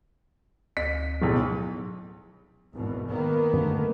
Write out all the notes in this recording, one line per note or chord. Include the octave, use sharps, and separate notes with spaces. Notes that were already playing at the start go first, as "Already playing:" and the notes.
D2 B6
D1 B1
G#1 E2 B2
D#3 A#3 B3
F#2 D3 A3